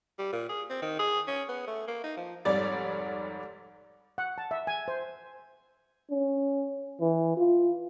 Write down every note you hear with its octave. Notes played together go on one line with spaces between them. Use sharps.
G3
A#2
G#4
C4
D#3
G#4
C#4
B3
A3
A#3
D#4
F3
F1 G#2 G3 C#5 D5 A6
F#5
A5
E5
G#5
C5
C#4
E3
F4